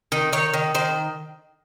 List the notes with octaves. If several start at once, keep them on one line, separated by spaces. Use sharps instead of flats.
D#3
D#3 C#5
D#3
D#3 C5